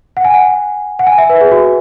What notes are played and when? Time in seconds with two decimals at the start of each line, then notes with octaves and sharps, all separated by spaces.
0.17 F#5
0.25 G#5
0.34 F#5
0.99 F#5
1.07 G#5
1.18 E5
1.29 B4
1.41 G#4
1.51 F#4